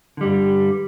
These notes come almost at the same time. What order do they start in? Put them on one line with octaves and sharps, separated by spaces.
D3 G3 G2